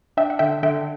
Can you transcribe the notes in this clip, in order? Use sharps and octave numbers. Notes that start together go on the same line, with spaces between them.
D4 E5 G5
F#5
D3 E5 G5
D3 E5 G5